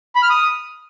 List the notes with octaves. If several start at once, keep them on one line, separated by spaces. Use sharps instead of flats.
B5
F6
D#6